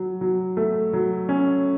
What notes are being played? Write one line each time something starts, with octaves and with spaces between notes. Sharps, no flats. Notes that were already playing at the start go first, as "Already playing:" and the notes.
Already playing: F#3
F#3
A3
F#3
C#4